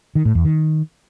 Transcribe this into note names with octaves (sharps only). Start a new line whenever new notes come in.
D#3
A2
E2
D#3